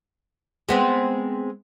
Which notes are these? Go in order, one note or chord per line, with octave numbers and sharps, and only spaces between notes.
G#3 B3 C4